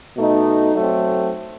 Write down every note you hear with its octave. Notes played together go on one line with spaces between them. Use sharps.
B2 A3 D#4
F#3 A3 C4